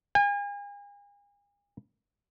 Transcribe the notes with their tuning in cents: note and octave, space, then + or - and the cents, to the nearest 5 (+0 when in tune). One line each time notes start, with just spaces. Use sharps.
G#5 -40